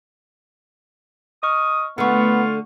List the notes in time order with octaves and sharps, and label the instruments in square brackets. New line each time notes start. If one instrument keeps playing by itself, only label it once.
[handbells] D#5 C#6 F6 [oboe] D#6
[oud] D3 A3 [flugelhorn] B3 [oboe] F4 [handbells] F#5 C#6